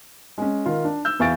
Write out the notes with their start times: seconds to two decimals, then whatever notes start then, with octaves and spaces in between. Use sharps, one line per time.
0.38 G#3 C#4
0.65 D#3 F4
0.84 D4
1.05 E6 G6
1.19 E2 E3 F5 C#6 A6 D7